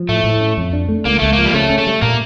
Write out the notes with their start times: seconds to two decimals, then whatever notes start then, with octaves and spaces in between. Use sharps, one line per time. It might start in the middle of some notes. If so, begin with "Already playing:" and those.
Already playing: F3
0.09 A2 A3
0.24 A2
0.41 C#4
0.57 F2
0.73 D4
0.89 A3
1.05 C#2 A#3
1.19 C#2 A3
1.33 A#3
1.38 F3
1.46 G3
1.54 C#3 A3
1.70 C#4
1.78 A3
1.87 G3
2.02 A#2 A#3